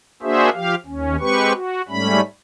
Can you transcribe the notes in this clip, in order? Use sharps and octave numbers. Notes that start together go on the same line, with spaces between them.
A#3 D4 F#4 G#4 C5 E5
F3 G4 F5
D#2 C#4
G#3 C4 G4 B4 C#6
F#4
G#2 G3 A3 C#4 B5